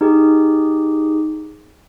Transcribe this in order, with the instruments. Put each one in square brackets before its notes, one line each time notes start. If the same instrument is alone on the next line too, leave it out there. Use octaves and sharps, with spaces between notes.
[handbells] D#4 G4 G#4